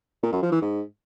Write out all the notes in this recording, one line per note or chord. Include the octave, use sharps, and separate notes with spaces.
A#2
F#2
F3
E3
G#2